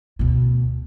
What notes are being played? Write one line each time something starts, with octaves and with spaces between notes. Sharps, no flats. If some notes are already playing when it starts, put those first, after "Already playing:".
D2 B2